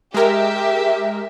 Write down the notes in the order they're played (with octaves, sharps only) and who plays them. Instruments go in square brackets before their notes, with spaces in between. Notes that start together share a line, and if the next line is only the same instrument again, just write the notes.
[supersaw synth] G#3 A#4 [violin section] G4 E5